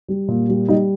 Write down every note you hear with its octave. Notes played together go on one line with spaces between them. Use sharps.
G3
A#2
G3
G3 D#4